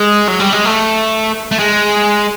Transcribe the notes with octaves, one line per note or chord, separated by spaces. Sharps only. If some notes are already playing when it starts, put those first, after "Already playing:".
Already playing: G#3
F#3
G3
G#3
A3
A3
G#3